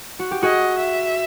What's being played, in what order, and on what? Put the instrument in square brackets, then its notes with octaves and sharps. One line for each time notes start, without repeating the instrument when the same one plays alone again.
[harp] F#4
G4
[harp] F#4 G#4 [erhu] D#5
[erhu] E5